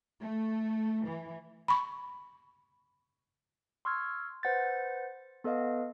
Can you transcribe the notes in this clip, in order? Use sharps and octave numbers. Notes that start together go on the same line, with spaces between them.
A3
E3
B5 C#6
C6 C#6 E6 F6 G#6
B4 C5 F#5 G6 A6
B3 A4 B4 D#5 F5